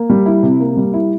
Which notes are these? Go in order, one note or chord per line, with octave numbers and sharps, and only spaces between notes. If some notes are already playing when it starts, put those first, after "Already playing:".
Already playing: A#3
G3
E4
C3
A#3
G3
E4